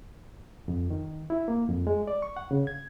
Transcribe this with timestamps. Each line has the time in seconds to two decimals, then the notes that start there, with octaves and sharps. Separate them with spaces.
0.68 F2
0.90 D#3
1.30 E4
1.48 A#3
1.68 F2
1.87 G#3
2.07 D5
2.22 C#6
2.36 F#5
2.51 C#3
2.67 G#6